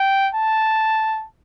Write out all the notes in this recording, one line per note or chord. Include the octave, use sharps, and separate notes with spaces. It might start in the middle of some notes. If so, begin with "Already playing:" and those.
Already playing: G5
A5